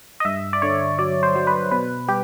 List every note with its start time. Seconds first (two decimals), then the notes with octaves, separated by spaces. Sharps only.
0.20 D#5
0.25 G2 E5
0.53 D5
0.62 D3 C#5
0.99 F#3 D5
1.23 C5
1.36 F#3
1.47 B4
1.71 B2 B4
2.08 G3 G4